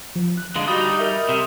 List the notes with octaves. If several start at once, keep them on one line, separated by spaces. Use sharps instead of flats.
F3
F#6
D3 G#3 F5
G3 D#4 F#4 D#6
A#4 E5
C3